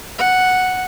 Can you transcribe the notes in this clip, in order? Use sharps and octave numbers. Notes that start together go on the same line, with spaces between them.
F#5